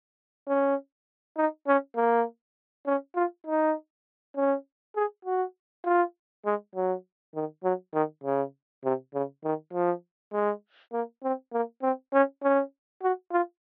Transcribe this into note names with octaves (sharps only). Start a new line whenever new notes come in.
C#4
D#4
C#4
A#3
C#4
F4
D#4
C#4
G#4
F#4
F4
G#3
F#3
D#3
F#3
D#3
C#3
C3
C#3
D#3
F3
G#3
A#3
C4
A#3
C4
C#4
C#4
F#4
F4